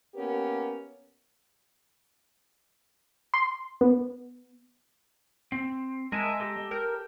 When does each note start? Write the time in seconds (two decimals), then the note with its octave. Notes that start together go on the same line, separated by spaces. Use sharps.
0.14 A#3 B3 C#4 G4 A#4
3.34 C6
3.81 B3
5.52 C4
6.12 G#3 A#4 E5 G#5 A5
6.40 G4 A4 A#5
6.71 A#4 G5